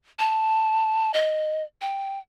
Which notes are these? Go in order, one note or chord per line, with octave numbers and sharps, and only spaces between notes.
A5
D#5
G5